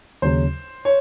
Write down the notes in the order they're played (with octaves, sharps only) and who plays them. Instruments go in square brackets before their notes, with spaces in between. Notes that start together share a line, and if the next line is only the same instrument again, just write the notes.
[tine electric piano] D#2 C#3 F#3 [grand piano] C5
[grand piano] C#5